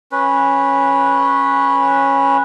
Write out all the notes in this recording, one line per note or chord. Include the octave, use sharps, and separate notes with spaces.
C#4 B4